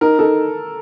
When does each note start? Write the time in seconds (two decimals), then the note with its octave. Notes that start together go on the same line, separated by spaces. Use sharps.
0.01 D#4 A#4
0.19 D#4 A4